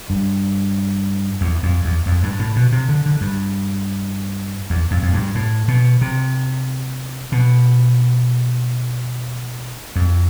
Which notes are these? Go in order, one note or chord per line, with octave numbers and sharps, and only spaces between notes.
G2
E2
F2
E2
F2
G2
A2
B2
C3
D3
D3
G2
E2
F2
F2
G2
A2
B2
C3
B2
F2